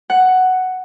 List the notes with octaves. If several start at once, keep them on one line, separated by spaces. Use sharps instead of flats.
F#5